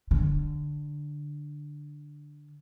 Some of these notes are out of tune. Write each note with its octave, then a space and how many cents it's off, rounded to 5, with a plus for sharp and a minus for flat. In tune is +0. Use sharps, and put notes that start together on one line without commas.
D3 +5